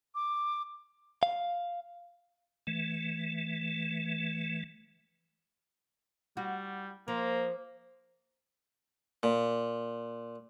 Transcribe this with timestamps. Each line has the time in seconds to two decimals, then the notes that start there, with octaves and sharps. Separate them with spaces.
0.15 D6
1.23 F5
2.67 E3 A3
6.37 G3 F#4
7.08 F3 A#3
9.23 A#2